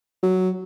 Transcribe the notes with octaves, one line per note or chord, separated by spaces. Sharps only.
F#3